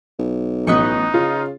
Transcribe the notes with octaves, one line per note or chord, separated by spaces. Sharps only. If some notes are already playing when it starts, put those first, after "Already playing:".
B1
A1 B3 D#4 B4 D#5 C#6
C#3 F4